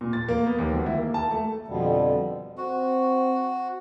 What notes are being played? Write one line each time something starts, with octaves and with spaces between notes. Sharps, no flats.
A#2
A6
A#3
B3
D#2
D2
E4
A#3
A5
A3
F2 B2 D3 G3
C4 F#4